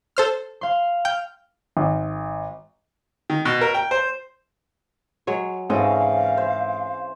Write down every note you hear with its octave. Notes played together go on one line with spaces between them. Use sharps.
A4 C5 F6
F5 C6
G5 F6
G#1
D#3
B2
A#4
G5
C5
F#3 G#3 C#5
G#2 C#3 E3 C4 A4 D#5 F5
C5